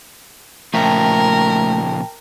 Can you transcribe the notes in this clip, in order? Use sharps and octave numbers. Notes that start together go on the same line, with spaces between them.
A#2 C#3 F3 A3 A#4 E5 G5 A5